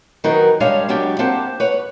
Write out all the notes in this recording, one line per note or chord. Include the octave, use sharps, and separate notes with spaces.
D#3 F#3 D#4 A#4 B4
G3 G#3 D4 C#5 F5
F#3 G#3 B3 D4 G4
A#3 C4 G4 C5 F#5 A5
B4 C#5 F#5